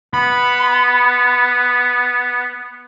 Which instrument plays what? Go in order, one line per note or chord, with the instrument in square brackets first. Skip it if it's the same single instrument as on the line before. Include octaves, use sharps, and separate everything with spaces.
[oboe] B3 [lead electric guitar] B5